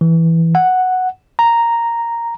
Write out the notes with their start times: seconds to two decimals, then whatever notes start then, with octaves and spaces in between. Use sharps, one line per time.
0.01 E3
0.55 F#5
1.39 A#5